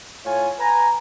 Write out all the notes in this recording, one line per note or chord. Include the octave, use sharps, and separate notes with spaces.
A2 F4 C#5 G#5
B4 G#5 A#5